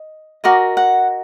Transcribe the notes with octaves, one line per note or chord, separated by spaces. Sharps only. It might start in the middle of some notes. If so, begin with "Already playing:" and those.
Already playing: D#5
F#4 A#4 D#5 D6
F#5